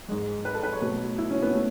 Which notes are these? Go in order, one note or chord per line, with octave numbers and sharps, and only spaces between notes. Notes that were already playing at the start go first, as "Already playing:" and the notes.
G#2 G#3
B4
A4
B4
C#5
B2 F#3 A3
E4
C#4
B3
A3